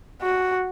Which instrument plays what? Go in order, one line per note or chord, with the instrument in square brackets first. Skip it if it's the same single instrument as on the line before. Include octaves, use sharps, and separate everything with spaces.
[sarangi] F#4